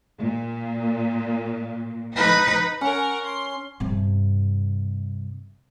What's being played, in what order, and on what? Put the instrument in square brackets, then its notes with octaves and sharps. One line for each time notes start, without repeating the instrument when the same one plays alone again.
[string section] A#2
[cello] D#4 B4
[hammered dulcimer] C#4 [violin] A#4 F#5
[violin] C6
[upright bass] G2 C3